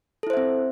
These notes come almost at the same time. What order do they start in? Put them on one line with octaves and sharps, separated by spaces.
A4 E4 C5 E5 C4